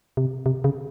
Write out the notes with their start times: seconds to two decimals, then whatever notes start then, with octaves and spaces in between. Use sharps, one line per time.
0.17 C3
0.46 C3
0.64 C#3